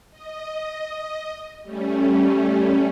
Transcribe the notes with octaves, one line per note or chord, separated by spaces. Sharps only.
D#5
G3 A3 C#4